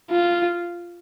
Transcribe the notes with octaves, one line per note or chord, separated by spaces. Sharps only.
F4